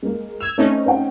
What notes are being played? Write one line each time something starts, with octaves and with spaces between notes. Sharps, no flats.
G#3 A#3
E6 G#6 F7
A3 C4 C#4 D#4
C5 F#5 G5